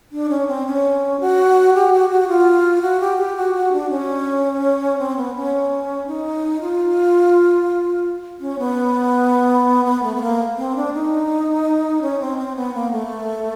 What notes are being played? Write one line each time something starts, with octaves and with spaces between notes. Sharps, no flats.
D4
C#4
C4
C#4
F#4
G4
F#4
F#4
F4
F#4
G4
G4
F#4
F#4
D4
C#4
C4
B3
C#4
D#4
F4
C#4
B3
B3
A3
B3
A#3
C4
D4
D#4
C#4
C4
C4
B3
A#3
A3